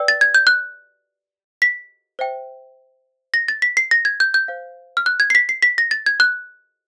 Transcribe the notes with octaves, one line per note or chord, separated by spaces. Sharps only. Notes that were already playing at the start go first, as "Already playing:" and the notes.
Already playing: B4 D5 G5 E6
A6
G#6
G6
F#6
B6
C5 E5 G5
A#6
A6
B6
C7
A#6
G#6
G6
G6
C5 F5
F6
F#6
G#6
C7
B6
C7
B6
A#6
A6
G#6
F#6